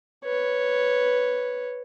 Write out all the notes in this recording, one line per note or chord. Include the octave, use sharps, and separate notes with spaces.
B4 C#5